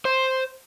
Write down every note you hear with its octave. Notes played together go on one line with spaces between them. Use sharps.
C5